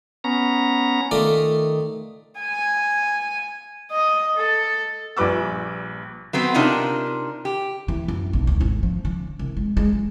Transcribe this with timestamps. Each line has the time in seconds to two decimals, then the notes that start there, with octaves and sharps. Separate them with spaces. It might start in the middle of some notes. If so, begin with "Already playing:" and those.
0.24 B3 C#4 A#5
1.11 D#3 A3 F4 D5
2.40 G#5
3.92 D#5
4.37 A4
5.17 A#1 A#2 G3 B4 D6 E6
6.33 F#3 B3 C4 C5
6.54 C3 D4 D#4 F4 A#4
7.45 G4
7.88 E3
8.08 F#2
8.33 B1
8.47 D2
8.61 G#1
8.83 F3
9.05 D3
9.39 C2
9.57 G#3
9.77 G#3
9.93 F#3